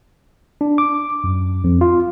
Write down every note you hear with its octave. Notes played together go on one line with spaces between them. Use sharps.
D4
D6
F#2
F2
F4